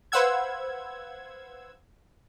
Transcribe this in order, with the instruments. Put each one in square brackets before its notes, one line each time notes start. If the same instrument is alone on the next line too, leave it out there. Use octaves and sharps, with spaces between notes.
[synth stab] B4 C5 F5 F#5 E6 G#6